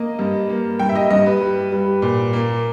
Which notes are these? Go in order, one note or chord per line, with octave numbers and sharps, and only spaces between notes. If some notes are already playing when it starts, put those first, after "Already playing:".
Already playing: A#3 D#5
G2
A#3
G2 G5
E5
D#5
G2 D#5
B4
G3
G3
A#2
A#3